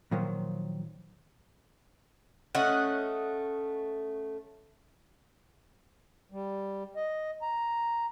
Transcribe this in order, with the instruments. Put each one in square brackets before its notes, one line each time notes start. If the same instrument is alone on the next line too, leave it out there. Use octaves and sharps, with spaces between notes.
[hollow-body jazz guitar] A#2 D#3 F3 F#3
[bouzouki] A3 C#4 D#5 F#5
[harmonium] G3
D#5
A#5